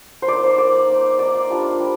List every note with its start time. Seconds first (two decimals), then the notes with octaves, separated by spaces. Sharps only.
0.22 C5
0.28 A#3 D#4 D5
0.44 C5
0.58 A#3 D#4 D5
0.89 A#3 D#4
1.19 A#3 D#4 D5
1.50 G3 D4 F4
1.80 G3